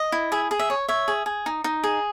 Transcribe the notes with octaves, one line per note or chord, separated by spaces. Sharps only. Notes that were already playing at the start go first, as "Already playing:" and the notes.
Already playing: D#5
E4
G#4 E5
G#4
E5
C#5
C#5 E5
G#4
G#4
D#4
D#4
G#4